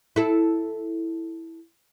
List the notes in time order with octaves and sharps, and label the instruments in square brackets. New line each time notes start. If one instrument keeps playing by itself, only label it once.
[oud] E4 A4